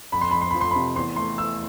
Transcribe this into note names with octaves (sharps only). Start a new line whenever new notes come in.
F2 B5
C6
F2 B5
C6
F3 B5
C6
B5
C3
E2 C6
A3 C6
E3 E6